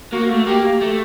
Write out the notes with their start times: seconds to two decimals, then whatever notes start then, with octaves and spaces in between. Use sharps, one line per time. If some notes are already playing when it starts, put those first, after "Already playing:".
0.12 A#3 F#4
0.30 A3
0.47 A#3 G4
0.81 A3